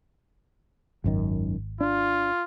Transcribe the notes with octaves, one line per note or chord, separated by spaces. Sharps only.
G#1 C#2 F#2 D#3
D4 F4